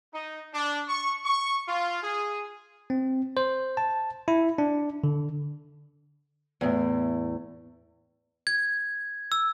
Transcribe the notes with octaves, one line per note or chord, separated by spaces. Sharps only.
D#4
D4
C#6
C#6
F4
G#4
C4
C5
A5
E4
D4
D3
E2 A2
G#6
E6